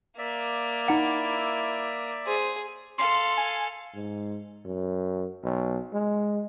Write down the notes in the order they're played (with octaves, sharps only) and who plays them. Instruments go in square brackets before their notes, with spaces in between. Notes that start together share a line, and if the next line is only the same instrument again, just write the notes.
[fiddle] A#3 [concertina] D5 E5
[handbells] D#4 F#5 [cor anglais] E4
[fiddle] G#4 [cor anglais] C5
[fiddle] A4 F5 [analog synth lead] C6
[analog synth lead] G#5
[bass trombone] G#2
F#2
B1
G#3